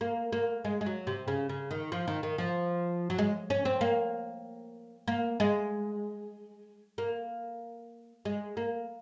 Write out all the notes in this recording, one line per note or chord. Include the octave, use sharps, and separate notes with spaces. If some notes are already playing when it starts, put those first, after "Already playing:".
A#3
A#3
G#3
G#3
F#3
C3
C#3
C#3
D#3
F3
D#3
D#3
F3
F#3
G#3
C#4
C4
A#3
A#3
G#3
A#3
G#3
A#3